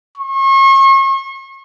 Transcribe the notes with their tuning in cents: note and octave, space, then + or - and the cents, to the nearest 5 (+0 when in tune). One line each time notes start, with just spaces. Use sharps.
C#6 -40